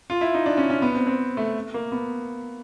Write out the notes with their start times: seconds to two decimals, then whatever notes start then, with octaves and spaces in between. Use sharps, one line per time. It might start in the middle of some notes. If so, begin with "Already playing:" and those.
0.10 F4
0.21 E4
0.34 D#4
0.46 D4
0.57 C#4
0.70 C#4
0.82 B3
0.95 C4
1.07 C4
1.37 A3
1.74 A#3
1.92 B3